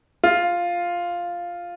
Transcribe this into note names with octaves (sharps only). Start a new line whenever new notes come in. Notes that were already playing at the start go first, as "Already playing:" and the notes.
F4